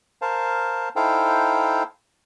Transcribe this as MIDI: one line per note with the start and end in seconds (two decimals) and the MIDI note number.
0.22 0.89 70
0.22 0.89 72
0.22 0.89 77
0.22 0.89 81
0.96 1.83 63
0.96 1.83 64
0.96 1.83 69
0.96 1.83 72
0.96 1.83 77
0.96 1.83 79